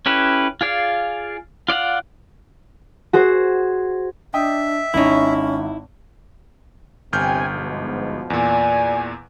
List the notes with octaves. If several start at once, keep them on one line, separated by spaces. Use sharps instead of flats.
C#4 E4 G4 A4 B4
F4 G#4 D5 F5
F4 D5 F5 F#5
F#4 G#4 C5
D4 D#5 E5 G5 D#6
G#1 C#4 D#4 E4
G1 C3 G5 G#5 F6 G6
G#2 B2 F3
E2 A#2 D5 G#5